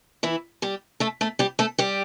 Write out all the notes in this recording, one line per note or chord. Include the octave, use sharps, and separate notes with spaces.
E3 E4
G3 G4
A3 A4
A3 A4
G3 G4
A3 A4
G3 G4